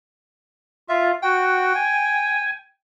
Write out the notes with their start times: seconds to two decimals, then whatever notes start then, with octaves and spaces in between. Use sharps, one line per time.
0.89 F4 E5
1.23 F#4 G5
1.75 G#5